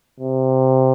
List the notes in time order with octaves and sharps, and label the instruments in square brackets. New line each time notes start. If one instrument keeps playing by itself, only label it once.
[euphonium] C3